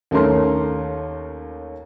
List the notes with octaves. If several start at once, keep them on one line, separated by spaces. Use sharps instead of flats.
D#2 A3 C#4 A#4 C6